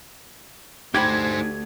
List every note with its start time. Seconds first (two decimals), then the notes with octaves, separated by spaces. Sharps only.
0.95 D2 D#4 G4 C5 G5 B5 G#6